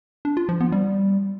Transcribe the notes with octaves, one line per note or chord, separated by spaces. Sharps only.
D4
F4
F3
B3
G3